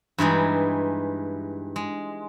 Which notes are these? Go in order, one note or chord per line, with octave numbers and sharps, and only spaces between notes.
G2 E3 G#3 D#4
G#3